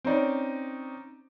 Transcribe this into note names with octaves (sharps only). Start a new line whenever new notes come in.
C4 C#4 D#4 D5